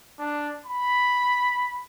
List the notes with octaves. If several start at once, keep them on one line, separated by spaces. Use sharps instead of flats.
D4
B5